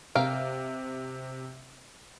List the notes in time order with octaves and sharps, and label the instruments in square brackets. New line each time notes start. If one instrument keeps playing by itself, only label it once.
[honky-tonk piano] C3 [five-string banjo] A#4 F5 G5